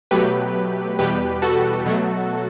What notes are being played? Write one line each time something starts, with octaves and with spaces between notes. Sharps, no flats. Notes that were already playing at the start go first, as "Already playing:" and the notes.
B2 F#3 A3 G4 B4
E2 B2 G3 G4 B4
F#4 A4
B2 F#3 A3